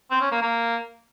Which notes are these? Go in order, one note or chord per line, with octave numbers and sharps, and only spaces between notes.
C4
C#4
A#3
A#3